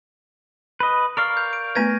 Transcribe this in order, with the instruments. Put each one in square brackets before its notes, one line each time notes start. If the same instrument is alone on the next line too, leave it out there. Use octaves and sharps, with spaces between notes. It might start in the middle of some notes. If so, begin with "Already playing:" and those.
[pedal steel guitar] B4 D#5
[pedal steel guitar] A#4 D5 F5 [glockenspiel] C#6 F6
[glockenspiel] G6
D7
[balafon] A3 B3 B4 [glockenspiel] G#6 A#6 D#7